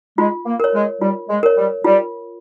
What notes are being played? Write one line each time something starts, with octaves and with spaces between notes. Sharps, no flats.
G#3 F4
A#3
A#4 C#5
G#3
G3 F4
G#3
A#4 C#5
G3
G3 F4